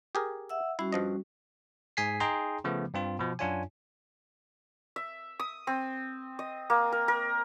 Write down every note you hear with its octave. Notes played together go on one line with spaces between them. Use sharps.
G4 G#4 A#4
E5 F#5 E6
G3 C#4 E4 F#4
G2 F3 D#5
G#2 G#4 G#5 B6 C7
D#4 G#4 G5 A#5 C6
C#3 F3 A3 B3
G2 C4 F4
B2 F3
F#2 D4 F4 C#5 G#5
E5
D#6
C4
D#5
A#3
A#4
A#4